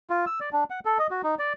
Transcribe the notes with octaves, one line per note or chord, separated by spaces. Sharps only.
F4
E6
D5
D4
F#5
A4
D#5
F#4
D#4
D5